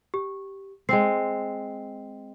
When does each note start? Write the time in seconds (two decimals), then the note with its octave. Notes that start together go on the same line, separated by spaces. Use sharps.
0.14 G4
0.89 G#3 C4 G5 C7